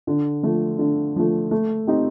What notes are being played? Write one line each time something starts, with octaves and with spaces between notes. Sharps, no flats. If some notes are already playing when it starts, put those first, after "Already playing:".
D3
F3 A3
D3
F3 A3
A3
C4 D#4 G4